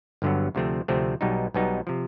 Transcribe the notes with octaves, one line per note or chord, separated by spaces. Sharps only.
G1 G2 D3 F#3 B3
D2 C3 F3 A3 C4
D2 C3 F3 A3 C4
B1 B2 G3 B3 D#4
B1 B2 G3 B3 D#4
C3 F3